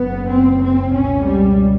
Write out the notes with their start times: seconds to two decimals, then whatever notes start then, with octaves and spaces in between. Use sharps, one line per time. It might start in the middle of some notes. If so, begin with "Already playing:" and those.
Already playing: F#1 F#2 C#3 B3
0.31 C4
0.63 C4
0.94 C#2 B2 C#4
1.25 G3